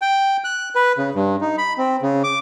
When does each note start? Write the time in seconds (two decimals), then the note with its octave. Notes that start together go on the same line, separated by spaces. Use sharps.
0.02 G5
0.44 F#6
0.75 B4
0.98 C#3
1.15 G2
1.41 D#4
1.58 B5
1.78 C4
2.02 C#3
2.24 D6